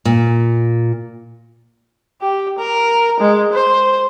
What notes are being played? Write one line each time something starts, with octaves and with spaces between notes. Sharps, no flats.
A#2
G4
A#4
G#3
C5